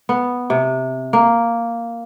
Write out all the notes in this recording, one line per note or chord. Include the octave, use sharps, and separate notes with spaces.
B3
C3
A#3